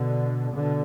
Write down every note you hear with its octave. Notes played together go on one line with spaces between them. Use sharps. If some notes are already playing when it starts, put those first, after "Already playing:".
Already playing: B2 D3
B2 D3